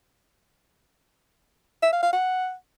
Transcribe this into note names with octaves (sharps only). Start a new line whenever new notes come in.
E5
F5
F5
F#5